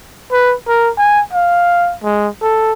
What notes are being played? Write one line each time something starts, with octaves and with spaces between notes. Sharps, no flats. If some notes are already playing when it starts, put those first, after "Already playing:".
B4
A#4
G#5
F5
G#3
A4